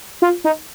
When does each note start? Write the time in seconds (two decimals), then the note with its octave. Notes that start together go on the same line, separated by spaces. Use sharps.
0.22 F4
0.44 D#4